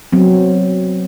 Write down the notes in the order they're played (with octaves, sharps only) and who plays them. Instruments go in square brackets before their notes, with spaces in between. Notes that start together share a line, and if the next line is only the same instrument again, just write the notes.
[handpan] F#3 B3 C4